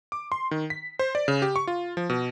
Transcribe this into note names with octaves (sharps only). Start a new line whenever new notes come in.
D6
C6
D#3
B6
C5
D5
C#3
G4
C#6
F4
F3
B2